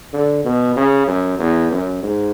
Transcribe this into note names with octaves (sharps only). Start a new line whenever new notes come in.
D3
B2
C#3
F#2
E2
F#2
G#2